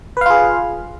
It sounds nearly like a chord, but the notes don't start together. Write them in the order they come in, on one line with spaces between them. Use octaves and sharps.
B4 F5 F4 G#4